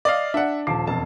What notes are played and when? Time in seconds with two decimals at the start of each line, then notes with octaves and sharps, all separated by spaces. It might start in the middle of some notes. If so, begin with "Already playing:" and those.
0.05 D5 D#5 F5
0.34 D4 E5 F#5
0.67 D#1 F3 D6 C7
0.87 E1 F2 A5